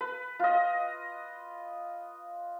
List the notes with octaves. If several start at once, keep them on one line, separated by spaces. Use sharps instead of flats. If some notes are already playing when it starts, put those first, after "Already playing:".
B4
F4 D#5